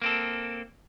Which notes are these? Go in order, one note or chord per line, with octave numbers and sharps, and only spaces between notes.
A#3 C4 A4